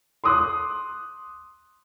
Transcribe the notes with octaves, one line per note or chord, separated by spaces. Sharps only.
C6 D6 D#6 F#6